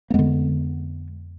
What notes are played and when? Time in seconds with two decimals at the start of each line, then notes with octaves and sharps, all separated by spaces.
0.10 A#3
0.14 F2 D3 G#3 B3